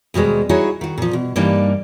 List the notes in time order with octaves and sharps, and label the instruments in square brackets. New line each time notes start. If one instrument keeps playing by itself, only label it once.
[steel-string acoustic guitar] D#2 B2 G3 G#3 C5
D#4 E4 F#4 G#4 C#5
D#3 F#4
A#2 F3
B2
G2 E3 G3 A#3 D4 D#4